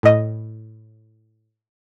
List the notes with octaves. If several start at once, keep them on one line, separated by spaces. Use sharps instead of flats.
A2 D#5